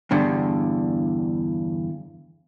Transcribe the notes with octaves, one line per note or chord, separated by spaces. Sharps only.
E2 G2 D3